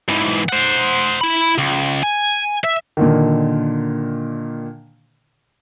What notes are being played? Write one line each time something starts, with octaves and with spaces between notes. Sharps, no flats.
G#2 E3
C5 F#5
E4 B5
C#2
G#5
E5
A#2 D3 D#3